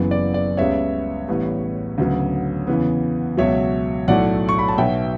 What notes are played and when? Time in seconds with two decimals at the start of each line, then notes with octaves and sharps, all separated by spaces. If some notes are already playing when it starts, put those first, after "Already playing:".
Already playing: F#1 F#2 E3 B3
0.11 D5
0.34 D5
0.57 C#2 C#3 G3 B3 C#5 E5
1.28 A1 A2 G3 B3
1.98 D2 C#3 F#3 B3
2.67 E2 C#3 E3 B3
3.37 C#2 B2 F#3 C#5 E5
4.08 B1 A2 F#3 A3 D5 F#5
4.49 C#6
4.59 B5
4.69 A5
4.78 B1 B2 F#3 B3 E5 G5